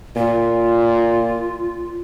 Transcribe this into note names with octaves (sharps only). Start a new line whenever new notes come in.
A#2 F4